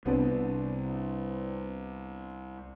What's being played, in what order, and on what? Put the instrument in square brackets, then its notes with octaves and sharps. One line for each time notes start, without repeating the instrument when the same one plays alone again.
[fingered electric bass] C2 [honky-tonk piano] B3 C4 D4